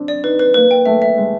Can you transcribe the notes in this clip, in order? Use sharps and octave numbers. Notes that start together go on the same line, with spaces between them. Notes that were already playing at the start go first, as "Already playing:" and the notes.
Already playing: C4 D4
D5
D#4 B4
B4
A#3 B4
G5
A3 E5
E5
G#3 B4